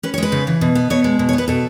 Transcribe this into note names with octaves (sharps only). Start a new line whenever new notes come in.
C#4 B4
C#5
G#3 B4
C#3
E3
B2
B3
B2 C#5
G#3
B2
C#5
B3
B4
B2 A4